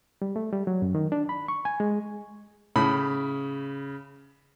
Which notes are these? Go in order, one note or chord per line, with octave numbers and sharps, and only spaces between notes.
G3
A3
G3
F#3
F#2
D#3
D4
B5
C#6
G#5
G#3
A2 C#3 B5